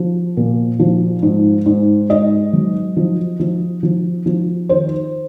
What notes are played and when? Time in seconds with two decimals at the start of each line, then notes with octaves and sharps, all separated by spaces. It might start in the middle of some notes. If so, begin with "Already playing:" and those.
Already playing: F3
0.37 A#2
0.80 F3
1.22 G#2
1.66 G#2
2.09 G#2 D#5
2.53 F#3
2.97 F3
3.40 F3
3.83 F3
4.26 F3
4.69 D#3 C5